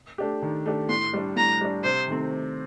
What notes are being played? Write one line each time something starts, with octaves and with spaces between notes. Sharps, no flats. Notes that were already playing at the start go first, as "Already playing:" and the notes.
A3 D4 G4
D#3
A3 D4 G4
A2 C6
G3 D4
A2 A#5
G3 D4
C3 C5
D#3 A3 C4